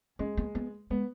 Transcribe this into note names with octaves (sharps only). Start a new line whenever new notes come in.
G#3 C#4
B3
B3
G#3 B3